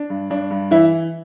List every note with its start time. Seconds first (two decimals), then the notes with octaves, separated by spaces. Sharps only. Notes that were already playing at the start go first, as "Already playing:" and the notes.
Already playing: D4
0.10 G2
0.30 G2 D4
0.51 G2
0.71 E3 E4